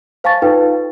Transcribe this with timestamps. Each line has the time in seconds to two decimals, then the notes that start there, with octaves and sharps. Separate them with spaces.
0.24 C5 F5 G#5 A5 C#6 A6
0.42 D#4 F4 A4 B4 F5 G5